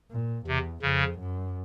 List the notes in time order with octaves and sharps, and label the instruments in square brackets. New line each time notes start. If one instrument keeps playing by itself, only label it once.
[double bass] A#2
[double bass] E2 [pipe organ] C3
[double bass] F2 [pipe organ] C#3
[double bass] F#2